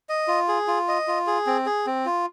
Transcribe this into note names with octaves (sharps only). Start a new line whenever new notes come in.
D#5
F4
G#4
F4
D#5
F4
G#4
C4
G#4
C4
F4